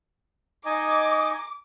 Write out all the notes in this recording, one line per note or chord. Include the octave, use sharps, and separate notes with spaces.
D#4 D#5 G#5 D6